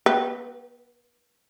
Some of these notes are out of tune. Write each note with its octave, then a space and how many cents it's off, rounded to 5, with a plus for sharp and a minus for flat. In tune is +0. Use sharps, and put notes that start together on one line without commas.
B3 -45 B4 +0 G5 -15